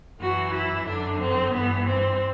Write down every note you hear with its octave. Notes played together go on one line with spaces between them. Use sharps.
F#2 E3 F#4
E4
F#2 D3 D4
C4
G2 E3 B3
C4